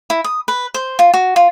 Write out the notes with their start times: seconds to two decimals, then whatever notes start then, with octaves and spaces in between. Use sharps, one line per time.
0.10 E4
0.24 D#6
0.48 B4
0.74 C5
0.99 F4
1.14 F#4
1.36 F4